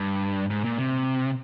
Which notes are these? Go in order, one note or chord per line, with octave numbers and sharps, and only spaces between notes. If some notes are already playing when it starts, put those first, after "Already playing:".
Already playing: G2
G#2
A#2
C3